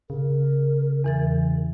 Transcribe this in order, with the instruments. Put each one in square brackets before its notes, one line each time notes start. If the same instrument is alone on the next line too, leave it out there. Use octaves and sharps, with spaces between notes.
[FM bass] C#3 [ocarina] A#4
[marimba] E2 E3 A6